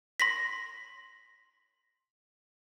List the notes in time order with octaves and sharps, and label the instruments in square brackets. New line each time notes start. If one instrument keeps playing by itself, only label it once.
[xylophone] C6 A#6 B6